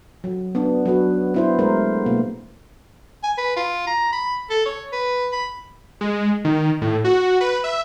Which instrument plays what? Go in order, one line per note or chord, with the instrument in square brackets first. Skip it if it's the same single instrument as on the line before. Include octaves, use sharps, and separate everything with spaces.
[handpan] F#3
B3 D4
F#3 D4 F#4 B4
B3 E4 C5
G#3 A3 A#4 C5
B2 A#3
[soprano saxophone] G#5
B4
F4
A#5
B5
A4
C#5
B4
B5
[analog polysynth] G#3
D#3
A2
F#4
B4
E5